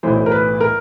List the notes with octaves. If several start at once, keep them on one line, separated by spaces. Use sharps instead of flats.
B1 A2 E3 C5
A#4
B4
A#4